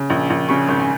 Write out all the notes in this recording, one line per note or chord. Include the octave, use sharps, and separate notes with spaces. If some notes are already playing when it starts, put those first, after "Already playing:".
Already playing: C#3
A#1
A#1
C#3 C#6
G#1
G#5